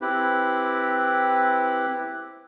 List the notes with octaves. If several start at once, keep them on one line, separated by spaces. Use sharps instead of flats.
C4 E4 G4 B4